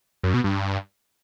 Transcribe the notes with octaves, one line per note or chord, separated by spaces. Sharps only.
F#2
B2
G2